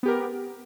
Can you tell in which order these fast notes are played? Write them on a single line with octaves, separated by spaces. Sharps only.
B3 G4 A#4